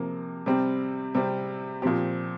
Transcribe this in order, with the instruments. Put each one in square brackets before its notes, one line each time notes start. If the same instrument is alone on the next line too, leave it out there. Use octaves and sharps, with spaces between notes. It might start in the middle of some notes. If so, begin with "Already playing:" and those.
Already playing: [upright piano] C3 F3 A#3
C3 G3 C4
C3 G3 C4
A#2 F3 C4 G4